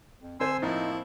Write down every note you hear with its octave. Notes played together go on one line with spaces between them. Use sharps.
F2
D3 C4 C5 G#5 C6 E6
A2 F3 A#3 D#4 E4